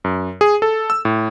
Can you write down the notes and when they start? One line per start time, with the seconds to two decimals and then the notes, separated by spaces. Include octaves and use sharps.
0.04 F#2
0.41 G#4
0.62 A4
0.90 E6
1.05 A2